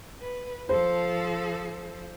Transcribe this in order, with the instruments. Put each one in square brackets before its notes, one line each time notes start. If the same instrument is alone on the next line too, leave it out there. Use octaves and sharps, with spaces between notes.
[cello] B4
[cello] F3 A4 [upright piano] C5